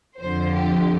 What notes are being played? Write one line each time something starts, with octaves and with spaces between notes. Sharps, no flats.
F2 D3 F3 C5
G4